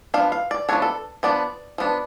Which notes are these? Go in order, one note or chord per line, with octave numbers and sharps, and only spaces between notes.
F3 B3 D4 F5
F5
D5
F3 B3 D4 C#5
A4
F3 B3 D4 D5
F3 B3 D4